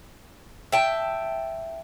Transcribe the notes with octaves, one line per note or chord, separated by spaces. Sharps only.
E5 G5 A5